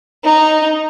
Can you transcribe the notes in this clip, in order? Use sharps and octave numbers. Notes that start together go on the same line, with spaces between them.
D#4